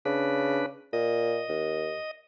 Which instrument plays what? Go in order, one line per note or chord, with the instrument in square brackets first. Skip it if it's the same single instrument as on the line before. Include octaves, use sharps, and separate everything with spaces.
[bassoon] C#3 [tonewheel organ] D4 B4
[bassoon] A#2 [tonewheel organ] D#5
[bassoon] D#2